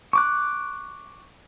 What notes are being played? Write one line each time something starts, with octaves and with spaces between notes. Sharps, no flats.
C#6 D6 F#6